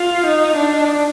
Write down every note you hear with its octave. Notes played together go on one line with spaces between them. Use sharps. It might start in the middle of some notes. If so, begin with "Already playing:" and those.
Already playing: F4
D#4
D4